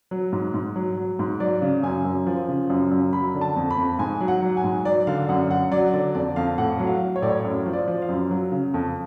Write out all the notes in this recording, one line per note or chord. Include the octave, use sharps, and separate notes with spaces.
F#3
G#2
G#2
F#3
F#3
G#2
F#3 D5
C#3
F#2 G#5
F#2
F3
C#3
F#2
F#2
F#3 B5
D3
A5
F2
B5
F2
G#2 G#5
F#3
F#5
F#3
G#5
G#2
F#3 D5
D3 F5
F#2 F#5
F#2 F#5
F#3 D5
D3 D5
F2 D5
F2 F5
A2 F#5
F#3
F5
F#3
C#5
A2 D5
C#5
F#2
F3
D5
F3
F5
F#2
F#3
C#3
F2